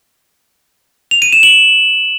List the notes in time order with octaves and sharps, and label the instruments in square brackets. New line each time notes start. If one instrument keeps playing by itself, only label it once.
[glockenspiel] F7
D#7
E7
F#7